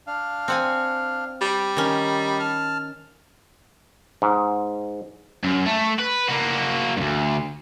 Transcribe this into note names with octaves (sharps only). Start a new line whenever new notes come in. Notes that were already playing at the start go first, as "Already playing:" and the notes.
D4 F5
C4 F#5 G#5
G3
D#3 C#4 D#4
A5 F6
G#2
F#2
A3
B4
A#3 F#4
D2 G2